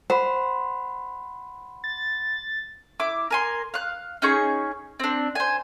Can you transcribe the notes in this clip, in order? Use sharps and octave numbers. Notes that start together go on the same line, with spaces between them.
C5 F#5 B5 C6
A6
E4 D6
A#4 G#5 C6
F5 F#6
C#4 D#4 G#4 C#6
C4 D4
C5 G#5